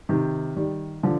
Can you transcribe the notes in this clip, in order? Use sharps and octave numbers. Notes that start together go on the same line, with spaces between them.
C3 D#3
D#3 G3
D3 F3